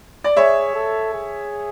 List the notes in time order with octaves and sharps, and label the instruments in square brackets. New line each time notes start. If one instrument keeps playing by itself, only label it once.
[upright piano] D5
[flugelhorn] G#4 [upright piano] C#5 E5
[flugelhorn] A4
G#4